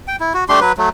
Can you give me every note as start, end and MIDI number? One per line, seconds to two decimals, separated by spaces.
0.08 0.16 79
0.20 0.33 64
0.34 0.44 66
0.49 0.60 57
0.49 0.60 62
0.49 0.60 67
0.49 0.60 84
0.61 0.72 54
0.61 0.72 71
0.77 0.89 54
0.77 0.89 57